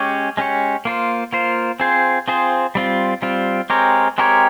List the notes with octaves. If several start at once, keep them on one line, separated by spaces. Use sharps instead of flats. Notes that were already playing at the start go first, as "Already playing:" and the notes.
Already playing: G#3 C#4 G4 C#5
G#3 C#4 G4 C#5
A#3 F4 C5
A#3 F4 C5
C4 F4 G#4 C5
C4 F4 G#4 C5
G3 C4 F4
G3 C4 F4
G#3 C4 G4 A#4 C#5
G#3 C4 G4 A#4 C#5